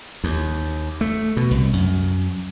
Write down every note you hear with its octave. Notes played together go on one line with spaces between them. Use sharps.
D#2
A3
B2
C2
F#2